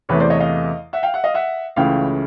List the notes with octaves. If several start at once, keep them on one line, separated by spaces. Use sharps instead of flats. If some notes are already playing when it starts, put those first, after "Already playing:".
E2 C3 E3 A3 B4 C#5
C5 D5
C#5 D#5
D#5 F5
E5 F#5
F5 G5
E5 F#5
D#5 F5
E5 F#5
C#2 C#3 E3 A3 F5 G5